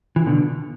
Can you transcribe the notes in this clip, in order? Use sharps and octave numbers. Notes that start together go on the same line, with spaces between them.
E3
B2 D3